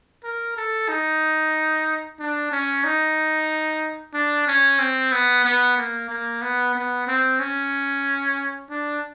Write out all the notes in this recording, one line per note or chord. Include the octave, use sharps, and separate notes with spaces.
A#4
A4
D#4
D4
C#4
D#4
D4
C#4
C4
B3
B3
A#3
A#3
B3
B3
C4
C#4
D4